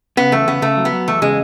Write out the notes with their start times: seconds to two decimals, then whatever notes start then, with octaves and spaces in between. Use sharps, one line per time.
0.17 C#3 B3
0.32 E2 A3
0.48 C#3 B3
0.62 C#3 A3
0.77 F#3
0.85 B3
0.92 F#3
1.07 E2 A3
1.22 C#3 G#3